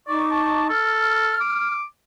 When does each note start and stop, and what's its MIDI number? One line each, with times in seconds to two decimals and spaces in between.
0.07 0.68 63
0.07 0.22 74
0.07 0.68 85
0.07 0.68 86
0.31 0.67 81
0.70 1.35 69
0.70 1.77 89
1.41 1.85 86